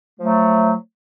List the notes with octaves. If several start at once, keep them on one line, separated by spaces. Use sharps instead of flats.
F3 F#3 A3